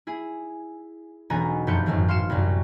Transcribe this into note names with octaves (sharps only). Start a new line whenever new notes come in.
E4 G#4
E1 B1 B3 G#5 A#5
F1 F#2 F3 B4 G6 C#7
G#1 F#2 A2 D#3
F5 C6 F6 C7 C#7 E7
C2 F#2